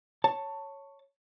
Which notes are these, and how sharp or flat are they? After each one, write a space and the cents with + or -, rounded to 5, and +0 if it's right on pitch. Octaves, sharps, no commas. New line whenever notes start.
C#5 +0 A5 +15